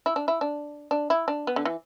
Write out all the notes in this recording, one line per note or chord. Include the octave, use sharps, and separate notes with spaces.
E4
D4
E4
D4
D4
E4
D4
B3
D3
E3